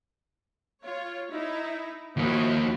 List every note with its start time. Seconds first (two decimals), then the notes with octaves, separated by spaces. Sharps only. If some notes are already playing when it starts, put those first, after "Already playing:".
0.84 F4 C#5
1.30 D#4 E4
2.17 D#2 F3 A#3 E4 F#4